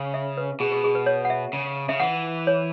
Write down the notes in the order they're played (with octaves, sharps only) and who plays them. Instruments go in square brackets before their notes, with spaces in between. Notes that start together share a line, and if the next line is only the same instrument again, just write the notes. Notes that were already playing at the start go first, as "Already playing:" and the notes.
Already playing: [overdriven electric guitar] C#3
[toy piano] E5
B4
[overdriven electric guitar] B2 [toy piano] G#4
[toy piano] G#4
G#4
B4
C#5
F#5
E5
[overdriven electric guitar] C#3
[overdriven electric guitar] C#3 [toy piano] E5
[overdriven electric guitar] E3 [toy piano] F#5
[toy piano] C#5